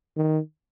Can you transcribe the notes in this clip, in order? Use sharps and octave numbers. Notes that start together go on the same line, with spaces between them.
D#3